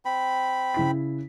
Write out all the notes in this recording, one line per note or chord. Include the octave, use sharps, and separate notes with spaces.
C4 B5
C#3 E4 B6